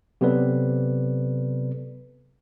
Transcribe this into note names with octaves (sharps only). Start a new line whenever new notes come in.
C3 F#3 B3 A4 B4 D5